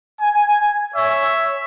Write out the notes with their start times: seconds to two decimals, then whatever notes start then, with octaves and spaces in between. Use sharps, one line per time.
0.21 G#5
0.95 C#5 E5